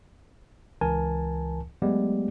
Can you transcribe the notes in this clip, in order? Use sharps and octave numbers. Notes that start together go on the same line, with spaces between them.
C#2 E3 A#4 G#5 A5
F#3 G#3 A3 B3 G4 D5